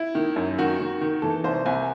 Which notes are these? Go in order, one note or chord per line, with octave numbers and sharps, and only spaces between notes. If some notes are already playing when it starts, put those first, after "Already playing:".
Already playing: E4
D#3
F#2
D#3 F#4
D#3
D#3
E3 A4
C2 C5
C2 G#5